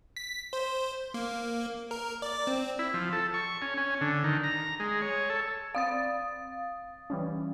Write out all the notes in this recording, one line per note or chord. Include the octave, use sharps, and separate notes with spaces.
B6
C5
A#3
A#4
D5
C4
E4
F3
A4
C#6
C#4
C#4
D3
D#3
A#5
G#3
C#5
A4
C4 D5 F5 D#6 A6
E3 G3 C#4